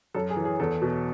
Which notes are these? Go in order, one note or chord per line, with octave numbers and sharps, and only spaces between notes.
F#2 A4
G#4
E3
G#4
E2 A4
B2